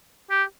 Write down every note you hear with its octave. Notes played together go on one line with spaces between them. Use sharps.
G4